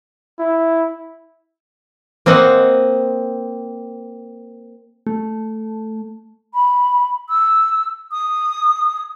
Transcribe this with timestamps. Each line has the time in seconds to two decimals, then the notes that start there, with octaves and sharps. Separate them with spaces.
0.40 E4
2.26 A#3 C4 C5 D#5 F#5
5.07 A3
6.54 B5
7.29 E6
8.12 D#6